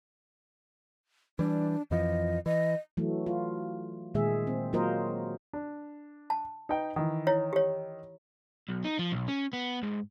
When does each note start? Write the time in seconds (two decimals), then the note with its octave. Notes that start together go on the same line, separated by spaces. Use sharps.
1.39 E3 G3 D4
1.91 F2 E3 F3 D#5
2.46 E3 D#5
2.97 E3 F#3 A3
3.26 F4
4.15 A#2 D#3 G#3 G#4 E5
4.47 C4
4.73 F#3 A#3 F4 A#4 C5 D#5
5.53 D4
6.30 A5
6.69 D#4 B4 G5
6.96 D#3 E3
7.27 E4 C#5
7.53 G4 C#5
8.69 B1
8.84 D#4
8.99 F3
9.12 B1
9.28 C#4
9.53 B3
9.83 G#2